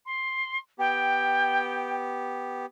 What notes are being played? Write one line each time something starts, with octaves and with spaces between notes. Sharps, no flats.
C6
B3 G4 G5